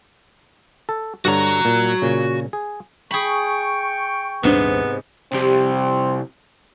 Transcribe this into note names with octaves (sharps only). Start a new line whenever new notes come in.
A4
G2 D3 F#4 C#5 A#5
A#2
A#2 C#3
G#4
G#4 G5 B5 C#6
D#1 G#2 C3 B3 C4 D4
C2 F2 C3 G3 C4 G4